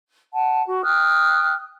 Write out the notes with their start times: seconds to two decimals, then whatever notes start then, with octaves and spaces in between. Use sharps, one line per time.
0.33 F#5 A5
0.67 F#4
0.83 G5 D#6 F6 F#6